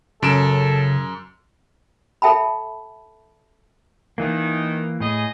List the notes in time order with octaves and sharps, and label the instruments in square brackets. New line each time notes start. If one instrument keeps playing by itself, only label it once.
[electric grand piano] F#2 D7 E7 [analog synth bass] C#3 [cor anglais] A4
[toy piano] A4 E5 G5 A5 B5
[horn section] D#3 [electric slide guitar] E3 A#3
[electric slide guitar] A2 [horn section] G#4 D#5